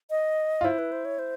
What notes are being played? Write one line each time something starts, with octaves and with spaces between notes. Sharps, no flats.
D#5
F4
E4 C5
B4
C5
C#5
C5